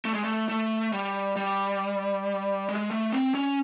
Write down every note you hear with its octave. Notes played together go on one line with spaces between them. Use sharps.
A3
G#3
A3
A3
G3
G3
G#3
A3
C4
C#4